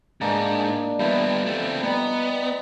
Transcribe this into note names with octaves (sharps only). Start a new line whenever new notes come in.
G#2 A#3 D4 D#4
F3 G3 B3 E4 B5
A3 C4
G3 B3 D#4